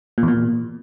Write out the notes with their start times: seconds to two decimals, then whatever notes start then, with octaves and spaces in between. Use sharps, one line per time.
0.18 A#2
0.23 E2
0.28 A#2